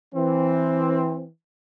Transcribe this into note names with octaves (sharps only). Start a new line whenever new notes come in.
E3 C4